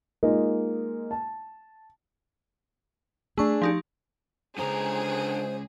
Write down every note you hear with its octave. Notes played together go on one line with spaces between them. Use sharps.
G#3 A#3 D#4 F4
A5
A3 D4 G#4 C#6
F3 D#4 G4
C#2 F#2 D3 G#4 C5 A#5